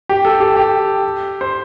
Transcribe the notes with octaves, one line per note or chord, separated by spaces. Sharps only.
G4
A4
G4
G4
C5